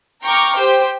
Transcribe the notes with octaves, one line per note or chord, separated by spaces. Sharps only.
G5 A#5 C#6 D6 F6
G4 C5 G5